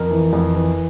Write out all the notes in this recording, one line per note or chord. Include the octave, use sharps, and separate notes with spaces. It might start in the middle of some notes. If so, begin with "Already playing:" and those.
Already playing: F2 A#4
E3
F2
E3